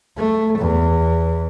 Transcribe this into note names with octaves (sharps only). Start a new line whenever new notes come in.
A3
E2